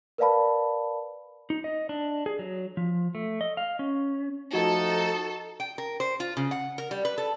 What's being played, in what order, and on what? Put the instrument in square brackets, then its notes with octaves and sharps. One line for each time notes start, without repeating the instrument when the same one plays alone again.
[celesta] A#4 B4 D5 F5 A5 B5
[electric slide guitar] D#4
D#5
D4
G#4
F#3
F3
A3
D#5
F5
C#4
[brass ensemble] F3 A3 D#4 [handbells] F#4 [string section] A4
[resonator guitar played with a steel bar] G5
A#4
C5
F4
C#3
F#5
A#4
G3
B4
A4